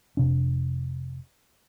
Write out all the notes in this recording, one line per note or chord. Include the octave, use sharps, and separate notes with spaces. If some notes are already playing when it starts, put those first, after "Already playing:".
F1 C3 D4